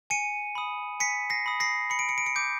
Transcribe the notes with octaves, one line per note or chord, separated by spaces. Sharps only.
G#5 C#7 D#7
B5 D#6
G#5 B6 C#7
A#6 C7
B5 D#6
A#6 C7
B5 C#7
D7
C#7
D7
C#7
D6 G6 D7